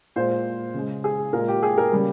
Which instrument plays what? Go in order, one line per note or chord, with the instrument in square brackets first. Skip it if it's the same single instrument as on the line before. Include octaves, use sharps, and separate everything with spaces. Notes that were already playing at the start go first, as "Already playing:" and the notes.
[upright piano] A#2 G#3 C5
C#3 G#3
G#4
A#2 G#3 A#4
G4
G#4
A#4
C#3 G3 A#3